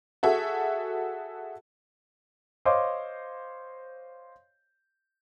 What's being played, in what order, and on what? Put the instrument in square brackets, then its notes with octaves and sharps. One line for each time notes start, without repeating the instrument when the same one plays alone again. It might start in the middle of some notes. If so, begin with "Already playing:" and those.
[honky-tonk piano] F#4 G#4 A4 E5
[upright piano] C5 C#5 D#5 F5 C6 D6